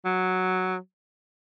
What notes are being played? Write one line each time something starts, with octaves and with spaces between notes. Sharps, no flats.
F#3